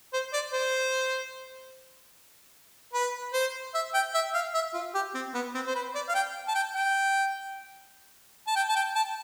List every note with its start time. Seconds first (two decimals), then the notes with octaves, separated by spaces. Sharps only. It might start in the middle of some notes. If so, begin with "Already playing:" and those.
0.13 C5
0.33 D5
0.53 C5
2.93 B4
3.33 C5
3.75 E5
3.94 G5
4.14 E5
4.35 F5
4.54 E5
4.74 F4
4.95 G4
5.15 C4
5.34 B3
5.55 C4
5.67 C5
5.75 B4
5.95 D5
6.09 F5
6.15 G5
6.48 A5
6.55 G5
6.75 G5
8.47 A5
8.56 G5
8.69 A5
8.76 G5
8.95 A5